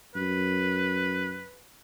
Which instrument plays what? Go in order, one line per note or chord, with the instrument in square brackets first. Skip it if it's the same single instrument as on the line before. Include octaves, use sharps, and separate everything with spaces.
[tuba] F#2 [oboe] B4